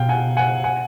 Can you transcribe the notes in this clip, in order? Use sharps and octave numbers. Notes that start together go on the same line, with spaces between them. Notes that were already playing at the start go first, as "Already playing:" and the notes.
Already playing: B2 F5 G5
F#5 G#5
F#5 G#5
F#5 G#5